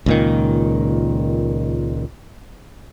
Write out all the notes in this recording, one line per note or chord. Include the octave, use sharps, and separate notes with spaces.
C#2 A#2 D#3